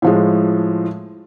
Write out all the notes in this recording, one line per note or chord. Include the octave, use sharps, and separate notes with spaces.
A2 F3 G#3